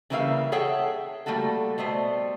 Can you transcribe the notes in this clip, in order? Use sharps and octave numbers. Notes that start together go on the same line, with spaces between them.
C#3 E3 G3 A#3 E5 F5
G#4 A4 C#5 E5 F#5 G5
G3 A3 A#3 F#4 A4
B2 G3 A3 C5